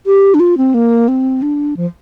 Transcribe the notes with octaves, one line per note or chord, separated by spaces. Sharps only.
G4
D4
F4
C4
A#3
C4
D4
F3